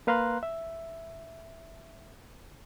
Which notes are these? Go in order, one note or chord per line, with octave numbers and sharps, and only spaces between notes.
A#3 B4 F5 A#5 C6 F#6
E5